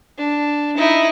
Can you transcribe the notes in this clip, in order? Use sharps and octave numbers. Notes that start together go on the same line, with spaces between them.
D4
D#4 E4